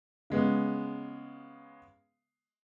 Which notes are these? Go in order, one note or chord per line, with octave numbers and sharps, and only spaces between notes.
C#3 G#3 B3